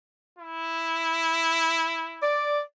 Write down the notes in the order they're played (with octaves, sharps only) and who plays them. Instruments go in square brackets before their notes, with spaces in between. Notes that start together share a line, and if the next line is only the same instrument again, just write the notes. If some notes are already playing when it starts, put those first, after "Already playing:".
[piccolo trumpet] E4
[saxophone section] D5